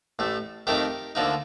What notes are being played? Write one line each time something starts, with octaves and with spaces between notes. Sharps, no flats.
A1 A2 A3
F2 D#3 A3 D#4 G4 A#4
D2 D3 F3 A#3 D#4